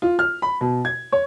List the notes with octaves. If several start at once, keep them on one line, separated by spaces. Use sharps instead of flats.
F4
F6
B5
B2
G#6
C#5